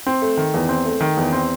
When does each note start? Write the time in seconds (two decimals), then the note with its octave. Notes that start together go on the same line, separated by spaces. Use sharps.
0.07 C4
0.22 A3
0.37 D#3
0.54 E2
0.69 C4
0.86 A3
1.01 D#3
1.17 E2
1.33 C4